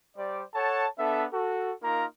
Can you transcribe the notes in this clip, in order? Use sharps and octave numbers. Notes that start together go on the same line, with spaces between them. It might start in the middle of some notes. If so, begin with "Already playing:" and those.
G3 C5 D5
A4 C#5 F#5 A5
B3 D4 A4 E5
F#4 A4
A#3 D#4 F4 A#4 A#5